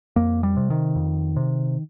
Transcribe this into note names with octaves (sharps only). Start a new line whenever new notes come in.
F2 A#3
G3
C3
D#3
F2
C3